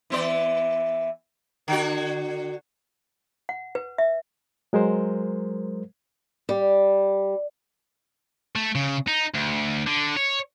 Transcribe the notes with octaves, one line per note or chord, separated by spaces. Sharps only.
E3 B3 D5
D3 F#4
F#5
B4
E5
F#3 G#3 A#4 C5
G3
A3
C#3
D#4
D2
D3
C#5